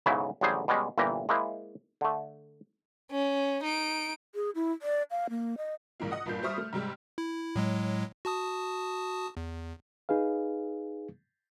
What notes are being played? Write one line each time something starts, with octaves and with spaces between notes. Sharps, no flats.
B1 G#2 C#3 F#3 E4 E5
A1 D3 F#3 G3 G#4 C5
B2 G3 G#3 C#4
G1 A#2 E3 G4 A#4 A#5
G#3 A#3 E4 C5
D3 A3
C#4
D#4 D7
G#4
E4
D5
F5
A#3
D#5
A#1 G#2 C#3 E3 A#3
D#5 F#5 D#6
G1 G2 A#2 A#3 G6
G3 C5 E5 C#6 D#6 F6
A3
G#2 C3 G3 G#3
E4
A2 F#3 G#3
F#4 A5 D#6
E2
D#4 G#4 B4 F5